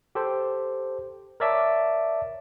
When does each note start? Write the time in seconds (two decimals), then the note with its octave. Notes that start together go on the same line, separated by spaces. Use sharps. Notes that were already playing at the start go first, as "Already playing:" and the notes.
0.15 G4 A4 C5
1.40 A#4 C#5 D5 E5 A5 D6